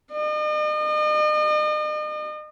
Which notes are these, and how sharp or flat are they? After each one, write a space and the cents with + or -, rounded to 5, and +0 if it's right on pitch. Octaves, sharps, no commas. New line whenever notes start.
D#5 -40